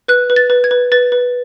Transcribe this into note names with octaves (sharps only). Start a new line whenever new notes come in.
B4 F#6
B4
A6
B4
G#6
B4
B4 A6
B4